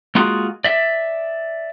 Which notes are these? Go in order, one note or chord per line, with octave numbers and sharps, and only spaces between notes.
G#3 A#3 F4 F#4 G#4
D5 E5